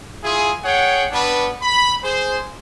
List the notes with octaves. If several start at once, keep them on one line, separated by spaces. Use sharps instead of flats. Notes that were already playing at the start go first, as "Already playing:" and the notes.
E4 F4 G#4
G#4 C#5 F#5 G5
G3 B3 D4 B4
B5
G#4 C5